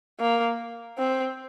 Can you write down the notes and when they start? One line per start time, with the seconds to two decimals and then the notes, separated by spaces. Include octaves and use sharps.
0.20 A#3
0.99 C4